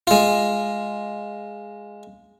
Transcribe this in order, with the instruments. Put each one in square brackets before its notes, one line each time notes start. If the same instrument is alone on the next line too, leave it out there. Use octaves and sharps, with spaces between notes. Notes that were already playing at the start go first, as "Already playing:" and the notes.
[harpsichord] G#3 F4